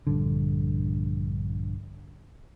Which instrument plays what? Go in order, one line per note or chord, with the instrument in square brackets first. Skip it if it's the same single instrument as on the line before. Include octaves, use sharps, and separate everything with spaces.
[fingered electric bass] A#1 G2 D3